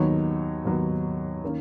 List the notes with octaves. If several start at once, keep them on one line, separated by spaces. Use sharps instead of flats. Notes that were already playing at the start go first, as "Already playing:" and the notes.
Already playing: D#2 D#3 F#3 B3 D#4 C#5
D#2 D#3 F#3 B3 D#4
D#3 A#3 C#4